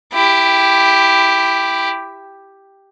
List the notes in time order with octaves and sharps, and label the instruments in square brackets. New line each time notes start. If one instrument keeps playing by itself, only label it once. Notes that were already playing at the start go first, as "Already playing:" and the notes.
[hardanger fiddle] E4 G4